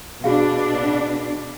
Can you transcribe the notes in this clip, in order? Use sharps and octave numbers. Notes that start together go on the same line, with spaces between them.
B2 D4 F#4 G#4 F5